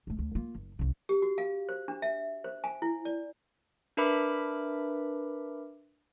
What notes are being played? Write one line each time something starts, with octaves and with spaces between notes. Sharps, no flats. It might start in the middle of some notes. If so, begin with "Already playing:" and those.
D#1 A3
D2
A#3 F4
F#1
C2 C#3
G4
F#4
F5
C5
D4
E5
C5
G#5
E4
D5
D4 A#4 B4 E5 B5 D6